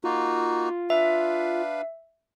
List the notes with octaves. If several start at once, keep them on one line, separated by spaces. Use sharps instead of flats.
A#3 D#4 F4 F#4
D4 B4 E5 F5